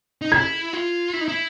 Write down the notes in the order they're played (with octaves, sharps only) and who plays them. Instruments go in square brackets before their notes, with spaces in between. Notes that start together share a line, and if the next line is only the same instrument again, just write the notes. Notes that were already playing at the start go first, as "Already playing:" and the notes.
[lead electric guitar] D#4
[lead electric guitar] E4 [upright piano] G#6
[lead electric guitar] F4
E4
D#4
E4